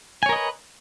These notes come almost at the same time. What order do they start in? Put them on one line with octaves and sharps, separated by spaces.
G#5 C#5 A#4 D#5 B4